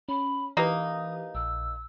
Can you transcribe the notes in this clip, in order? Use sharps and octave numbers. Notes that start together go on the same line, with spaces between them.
C#4 B5
E3 A#3 D#4 G4 B4 D#6
A#1 E6